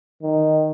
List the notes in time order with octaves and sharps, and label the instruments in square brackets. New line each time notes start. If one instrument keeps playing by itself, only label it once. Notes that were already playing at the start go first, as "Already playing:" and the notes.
[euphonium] D#3